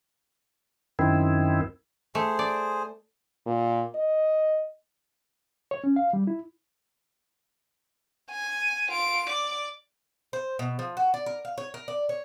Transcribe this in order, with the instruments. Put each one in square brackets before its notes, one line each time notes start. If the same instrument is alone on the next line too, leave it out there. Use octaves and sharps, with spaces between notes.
[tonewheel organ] F#2 D#3 C4 E4
[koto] A3 [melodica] G#4 C5
[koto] D5
[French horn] A#2
D#5
[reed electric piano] C#5
C#4
F5
G3
E4
[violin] G#5
F4 D7
D5 D6
[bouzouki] C5
B2
F3
F#4
D5
A#4
F5
C#5
A#4
D5
C#5